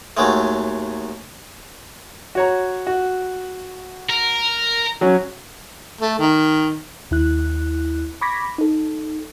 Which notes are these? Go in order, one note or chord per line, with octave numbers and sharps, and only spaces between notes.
D#2 F#3 G#3 A3
F#4 C#5 A#5
F#4
A#4
F#3 C#4
A3
D#3
D#2 E4 F#6
B5 C#6 D6 G#6 A#6 B6
D#4 A4